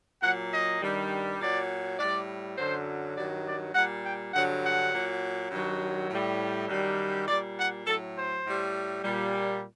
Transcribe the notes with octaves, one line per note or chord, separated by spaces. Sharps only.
A#2 F#3 F#5
D#5
G2 D#3 G3
A#2 F#3 D5
A2 G3 D5
F#2 D3 F#3 C5
G2 D#3 F#3 D5
D5
A#2 G3 F#5
G5
G2 D3 F#3 F#5
F#5
A#2 F#3
G2 D#3 F#3
A2 G3
F#2 D#3 G3
A#2 G3 D5
F#5
A2 F#3 A4
C5
A2 G3
A#2 G3